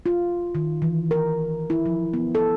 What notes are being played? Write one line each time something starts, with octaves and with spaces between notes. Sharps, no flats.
F4
D#3
E3
A#4
E4
F3
B3
A4